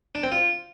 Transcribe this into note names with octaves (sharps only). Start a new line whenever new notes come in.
D4
C4
F4